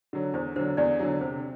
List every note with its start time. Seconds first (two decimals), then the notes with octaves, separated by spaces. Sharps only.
0.13 D3 F#3
0.34 E2 C5
0.56 D3 C5
0.59 F#3
0.77 E2 D5
0.99 D3 F#3
1.21 C3 C5